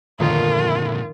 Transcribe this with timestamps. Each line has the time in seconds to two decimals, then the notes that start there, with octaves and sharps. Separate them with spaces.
0.20 G1 F2 A#2 D3 D#3 A3 F4